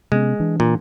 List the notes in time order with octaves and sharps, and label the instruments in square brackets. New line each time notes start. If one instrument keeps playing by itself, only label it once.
[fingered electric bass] C3 B3 C#4 [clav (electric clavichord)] G#3
[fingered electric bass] E3 D4
[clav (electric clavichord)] A#2